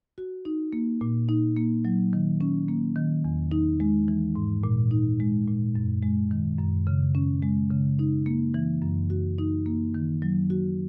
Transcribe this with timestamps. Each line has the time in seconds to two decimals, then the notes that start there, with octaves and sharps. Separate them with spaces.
0.18 F#4
0.45 D#4
0.73 A#3
1.01 A#2
1.29 D#4
1.57 A#3
1.85 F#3
2.13 D#3
2.41 C#4
2.69 A#3
2.96 D#3
3.25 E2
3.52 D#4
3.80 G#3
4.08 E3
4.36 G#2
4.64 A#2
4.91 D#4
5.20 G#3
5.48 A#2
5.75 F#2
6.03 G#3
6.31 D#3
6.59 F#2
6.87 C#3
7.15 C#4
7.43 G#3
7.71 C#3
7.99 D#4
8.26 A#3
8.54 E3
8.82 F#2
9.10 F#4
9.38 D#4
9.66 A#3
9.95 D#3
10.22 F#3
10.50 F#4